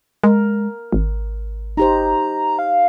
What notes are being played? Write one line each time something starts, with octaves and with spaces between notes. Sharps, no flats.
G#3 A#4
G#1
D#4 G4 C5 A#5
F5